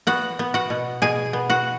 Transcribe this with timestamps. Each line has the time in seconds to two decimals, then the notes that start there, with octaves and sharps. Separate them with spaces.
0.07 B3 F#4 F#5
0.39 B3
0.54 F#4 F#5
0.70 B2
1.02 B2 G#4 G#5
1.33 B3
1.49 F#4 F#5